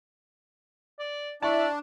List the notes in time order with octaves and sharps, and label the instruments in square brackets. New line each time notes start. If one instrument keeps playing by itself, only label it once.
[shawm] D5
[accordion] D4 [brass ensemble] E4 E5 [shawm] D5 [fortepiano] A5 C#6